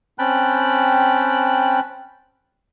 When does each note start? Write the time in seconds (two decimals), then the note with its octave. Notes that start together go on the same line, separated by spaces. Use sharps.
0.19 C4 C#4 G5 A5 B5 F#6